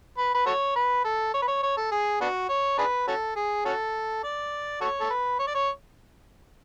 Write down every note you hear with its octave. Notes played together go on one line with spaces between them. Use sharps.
B4
B4
F#4 A4 C#5
B4
A4
C#5
B4
C#5
C#5
A4
G#4
B3 D4 F#4
C#5
D4 G#4 B4
C#4 F#4 A4
G#4
C#4 F#4 A4
D5
F#4 A4 C#5
A4
B4
C#5
D5
C#5